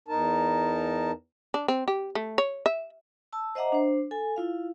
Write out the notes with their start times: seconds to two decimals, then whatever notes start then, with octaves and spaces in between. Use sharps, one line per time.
0.08 E2 D#4 A#4 A5
1.54 D4
1.68 C4
1.88 G4
2.15 A3
2.38 C#5
2.66 E5
3.33 A5 E6
3.55 C5 D#5 E5 F#5 A#5 D6
3.72 D4 C5
4.11 A4 G#5
4.36 E4 F4 F5